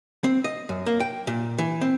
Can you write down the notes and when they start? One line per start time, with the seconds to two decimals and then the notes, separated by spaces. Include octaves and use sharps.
0.24 C4
0.44 D#5
0.69 F#2
0.86 A#3
1.00 G5
1.27 A#2
1.58 E3
1.81 C4